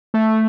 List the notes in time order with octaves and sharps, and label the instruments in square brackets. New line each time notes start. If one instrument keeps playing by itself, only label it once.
[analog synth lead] A3